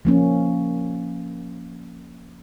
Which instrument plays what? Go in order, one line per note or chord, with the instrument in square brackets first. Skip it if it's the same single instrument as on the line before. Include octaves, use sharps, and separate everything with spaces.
[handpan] F3 A#3 C#4